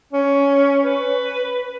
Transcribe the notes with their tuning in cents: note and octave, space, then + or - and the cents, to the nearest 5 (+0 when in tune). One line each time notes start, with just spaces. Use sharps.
C#4 +15
B4 +10